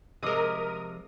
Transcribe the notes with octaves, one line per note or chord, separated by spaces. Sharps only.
C3 F3 G#3 A#4 D#5 D#6